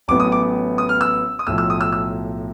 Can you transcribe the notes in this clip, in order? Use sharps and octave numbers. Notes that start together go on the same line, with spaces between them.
A1 A2 F#3 B3 D6
D#6
D6
D#6
F6
E6
D#6
B1 A2 F3 E6
E6
D#6
E6
E6